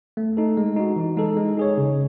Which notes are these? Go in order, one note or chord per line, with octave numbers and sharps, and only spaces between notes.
A3
D#4 A4
G#3
D#4 F#4
E3
G#3 D#4 A4
G#3
D#4 G#4 C#5
C#3